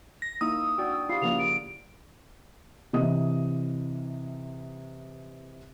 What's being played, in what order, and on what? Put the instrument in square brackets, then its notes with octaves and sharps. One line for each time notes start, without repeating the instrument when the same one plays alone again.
[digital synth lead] A#6
[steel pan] A#3 D#4 E4 [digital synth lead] D#6 [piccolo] E6
[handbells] D4 D5 G5 [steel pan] F#4
[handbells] E4 G4 [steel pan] F4 [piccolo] C7
[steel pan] C#3 F3 A#3 [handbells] D5 F5 F#5 [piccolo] F7
[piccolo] D7
[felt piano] C3 E3 D#5 D#6